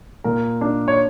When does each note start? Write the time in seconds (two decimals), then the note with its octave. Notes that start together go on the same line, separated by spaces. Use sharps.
0.24 A#2 A#4
0.61 D4
0.88 C#5